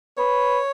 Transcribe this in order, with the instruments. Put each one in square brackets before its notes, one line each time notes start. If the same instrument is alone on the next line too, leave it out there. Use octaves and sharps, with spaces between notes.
[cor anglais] B4 [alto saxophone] C#5